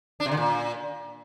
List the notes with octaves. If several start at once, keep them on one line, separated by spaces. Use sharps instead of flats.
D4
C3
D3
A#2